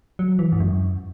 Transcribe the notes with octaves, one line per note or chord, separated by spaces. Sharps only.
F#3
E3
G#2
F#2